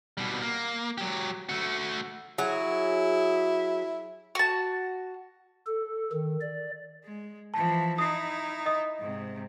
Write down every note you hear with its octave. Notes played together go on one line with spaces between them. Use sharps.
B2 G3
A#3
F#3 G4
A3 F#4
F#3 E4 G#4
F#4 A5
A4
D#3
D5
G#3
E3 F3 A5
D#4 E4 D#6 C7
D#5 D#6
G#2 C3